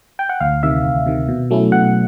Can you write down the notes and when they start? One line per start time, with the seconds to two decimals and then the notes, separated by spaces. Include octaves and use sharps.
0.19 G5
0.29 F#5
0.40 D2 F5
0.63 C3 D#3 E5
0.85 D2
1.06 C3 D#3
1.28 B2
1.51 F#3 A3 C#4 E4
1.72 B2 F#5